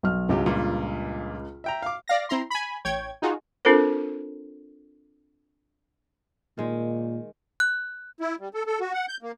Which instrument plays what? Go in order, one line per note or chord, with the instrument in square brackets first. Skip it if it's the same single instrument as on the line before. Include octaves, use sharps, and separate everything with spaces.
[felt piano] B1 F6
[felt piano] C#2 [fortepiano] G2 F#3 G4
[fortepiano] G2 A#2
E5 G5 A#5
F5 D6
[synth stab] D5 F5 A#6
C4 E4 A#5 C6
G#5 B5
A1 C#5 G5 G#6
D#4 F4 F#4 G#4
[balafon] C4 D4 F4 A4 A#4 C5
[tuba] A#2 [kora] D#3 G#3
[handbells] F#6
[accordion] E4
G3
A4
A4
F#4
F#5
G6
A#3